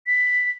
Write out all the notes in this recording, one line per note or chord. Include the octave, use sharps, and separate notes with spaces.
B6